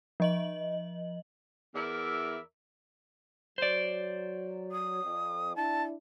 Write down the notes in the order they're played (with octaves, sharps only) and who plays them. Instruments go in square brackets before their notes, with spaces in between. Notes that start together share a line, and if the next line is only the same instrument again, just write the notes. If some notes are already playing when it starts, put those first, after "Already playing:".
[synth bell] F3 D#5 F#7
[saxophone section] E2 E4 A#4 D5 E5
[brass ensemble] F#3 [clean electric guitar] C5 D5
[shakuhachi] D#6
[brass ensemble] F2
[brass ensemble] D4 E4 [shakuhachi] A5